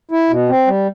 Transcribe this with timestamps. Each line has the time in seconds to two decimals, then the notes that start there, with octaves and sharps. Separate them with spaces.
0.11 E4
0.30 B2
0.49 C4
0.67 G3